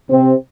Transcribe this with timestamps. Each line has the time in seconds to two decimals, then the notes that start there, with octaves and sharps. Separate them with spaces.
0.10 C3 C4